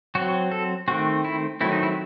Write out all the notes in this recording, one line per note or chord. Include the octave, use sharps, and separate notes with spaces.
F#3 C4 F#4
A4
D#3 A3 C4 F#4
E4
D#3 F#3 A3 C4 E4
D#4
E4